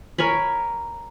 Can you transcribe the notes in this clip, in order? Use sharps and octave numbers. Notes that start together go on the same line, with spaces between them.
A#4 C#5 G#5 B5